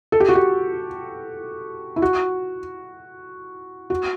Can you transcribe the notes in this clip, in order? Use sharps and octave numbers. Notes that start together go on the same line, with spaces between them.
A4
G4
F#4
G4
E4
F#4
F#4